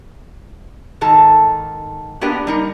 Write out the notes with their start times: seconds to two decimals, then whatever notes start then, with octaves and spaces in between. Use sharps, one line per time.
1.01 G#2 D#3 A4 A5
2.21 A#3 B3 D4 G4 A#4 B4
2.47 G3 D#4 A#4